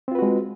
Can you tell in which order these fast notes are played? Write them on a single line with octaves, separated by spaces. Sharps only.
C4 F4 B4 F#4 G#3